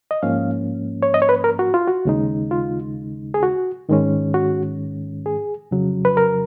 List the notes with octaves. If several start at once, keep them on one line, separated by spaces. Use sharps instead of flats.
D#5
G#2 F3 A#3 C#4 F5
C#5
D#5
C#5
B4
A#4
F#4
F4
F#4
D#2 C#3 G#3 D#4
F4
G#4
F#4
G#2 D#3 G#3 C#4
F#4
G#4
F2 C#3 F#3
B4
A#4